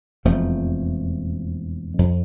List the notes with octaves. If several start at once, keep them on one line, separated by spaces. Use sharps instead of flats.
E1 F2 F3 A3
F2